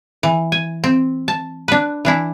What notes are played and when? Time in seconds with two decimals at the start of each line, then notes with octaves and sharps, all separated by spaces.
0.23 E3
0.52 G#5
0.84 C4
1.28 A5
1.68 D4 B4
2.05 E3 D4 E4